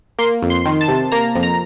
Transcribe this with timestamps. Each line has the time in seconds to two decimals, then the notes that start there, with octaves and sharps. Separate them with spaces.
0.19 A#3 C6
0.42 F2
0.50 C6
0.66 D#3
0.81 A5
0.88 C3
1.12 A#3 A#5
1.35 F2
1.43 A#5